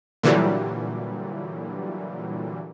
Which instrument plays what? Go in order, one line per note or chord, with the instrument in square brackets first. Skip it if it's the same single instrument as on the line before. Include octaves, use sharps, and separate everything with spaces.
[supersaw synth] A#2 D3 E3 F#3 G3